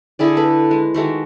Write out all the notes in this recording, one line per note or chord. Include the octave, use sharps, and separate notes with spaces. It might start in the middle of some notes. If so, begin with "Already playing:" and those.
D3 E4 G#4 D5
A4 B4 D5
G#3
D#3 G#3 A3 F#4